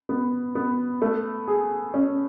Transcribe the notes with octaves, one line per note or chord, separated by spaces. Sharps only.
B3
B3
A3
G#4
C#4